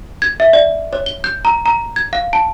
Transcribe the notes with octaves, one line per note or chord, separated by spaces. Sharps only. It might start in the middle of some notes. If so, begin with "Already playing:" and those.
G#6
E5
D5
C#5
G7
G6
A#5
A#5
G#6
F5
A5